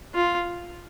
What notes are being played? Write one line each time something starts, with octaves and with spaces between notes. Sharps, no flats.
F4